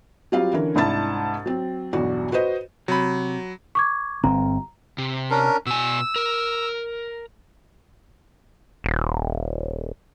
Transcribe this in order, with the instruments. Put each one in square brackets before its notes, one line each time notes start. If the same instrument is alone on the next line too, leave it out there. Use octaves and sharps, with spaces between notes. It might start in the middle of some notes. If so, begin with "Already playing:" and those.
[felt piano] F#3 G3 C4 F4 G4 F5
D3 E3 C#4 A#4
C2 G#2 D4 E4 A5 A6
F#3 C4
B1 E2 G2 D4 F#4
F#4 B4 C5 D#5
[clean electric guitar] C3 [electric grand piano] F#3 B5
[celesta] C#6 D6 G#6
[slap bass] G1 C4 [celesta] A#5
[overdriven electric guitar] C3
[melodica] C#4 D4 A#4
[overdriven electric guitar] B2 G#5 [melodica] E6
[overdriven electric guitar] A#4
[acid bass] D#1